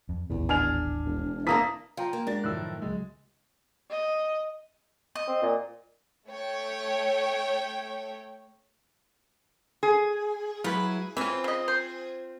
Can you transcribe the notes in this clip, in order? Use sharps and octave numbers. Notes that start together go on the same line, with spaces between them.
F2
D#1 A1 E2
D4 G#5 F6 F7
E1
E3 A#3 D4 A#5 D#6 B6
F3 F5 G5 A#5
A#3
G#3 D4 F#4 A#4 D5 A6
F#2 A2 D#3 F3 E6 F#6
C#2 C#3 F#3 G#3
D#5
D#5
C4
A#2
A3 C#5 G5
G#4
F#3 E4 F4 B4
E3 C4 C#4 F4
C#3 D#5
C5